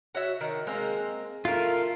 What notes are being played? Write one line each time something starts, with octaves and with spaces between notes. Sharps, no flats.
F#4 C#5 E5
D#3
G#3 A#3 C4
A3 F4 A#4